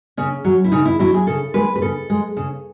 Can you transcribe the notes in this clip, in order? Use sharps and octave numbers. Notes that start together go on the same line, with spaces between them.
C#3 C#4
F#3
E4
C#3 D#4
E4
F#3 E4
G#4
C#3 A4
G#3 B4
B4
C#3 A4
G#3
C#3